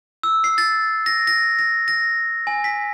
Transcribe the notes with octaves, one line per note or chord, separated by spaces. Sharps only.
E6
C7
A6
A#6
A#6
A#6
A#6
G#5
B6